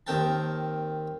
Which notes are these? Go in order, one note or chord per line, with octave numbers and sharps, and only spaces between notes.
D#2 C4 A#4 G5 A5